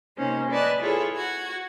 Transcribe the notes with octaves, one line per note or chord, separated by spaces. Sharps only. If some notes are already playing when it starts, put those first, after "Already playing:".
C3 A#3 C#4 D#4 C5
B4 D5 D#5 G#5 A5 F#6
E4 F4 G#4 A4 B4 C#5
F#4 G#6